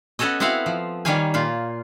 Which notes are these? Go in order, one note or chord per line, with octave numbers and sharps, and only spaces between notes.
B3 C#4 F#4 A4 C#5 D#5
B3 C4 E4 F#4 F5 F#5
F3
D#3 G3 A#3 C#5 F5 G#5
A#2 A#3 F4